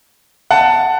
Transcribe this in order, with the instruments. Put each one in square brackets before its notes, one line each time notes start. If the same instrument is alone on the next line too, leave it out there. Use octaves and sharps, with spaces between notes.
[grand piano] F#5 A5